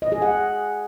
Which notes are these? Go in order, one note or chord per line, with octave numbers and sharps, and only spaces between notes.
D#5
G#4
F#5